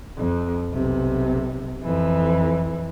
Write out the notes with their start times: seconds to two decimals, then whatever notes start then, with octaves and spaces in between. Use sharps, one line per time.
0.17 F2
0.73 B1 C3
1.83 F2 E3